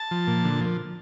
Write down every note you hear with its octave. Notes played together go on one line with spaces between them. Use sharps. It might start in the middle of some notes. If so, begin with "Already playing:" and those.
Already playing: A5
F3
A#2
D3
F3